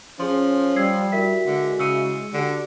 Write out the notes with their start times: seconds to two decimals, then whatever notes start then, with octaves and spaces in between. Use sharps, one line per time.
0.20 F3 C#4 G#4 C6
0.76 G3 E6 G#6 C7
1.12 E4 F#4 A#4 E5 B6
1.47 D3 G#3
1.80 C#3 E6 C#7 D#7
2.34 D3 D4 F#4 G4